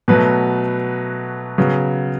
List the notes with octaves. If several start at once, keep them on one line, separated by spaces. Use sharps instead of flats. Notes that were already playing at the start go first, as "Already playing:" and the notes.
B2 F#3 A3 B4
C#3 F#3 B3